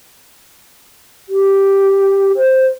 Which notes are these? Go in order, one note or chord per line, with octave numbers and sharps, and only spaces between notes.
G4
C5